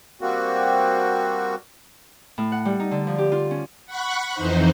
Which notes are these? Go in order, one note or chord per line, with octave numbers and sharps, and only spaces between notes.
G3 A#3 C4 F#4
A2
F#5
G3
D#4
D3
F3
G4
F4
C#4
F#5 B5 C#6 F#6
F2 E3 D#4 C5